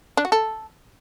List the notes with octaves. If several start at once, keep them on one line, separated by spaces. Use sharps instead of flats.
D4
F#4
A4